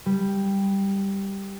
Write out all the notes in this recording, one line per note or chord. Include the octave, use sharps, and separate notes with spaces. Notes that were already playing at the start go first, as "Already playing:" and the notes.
G3